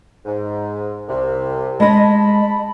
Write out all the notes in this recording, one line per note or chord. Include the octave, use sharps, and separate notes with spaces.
G#2
C2 C3
G#3 D#5 A5 B5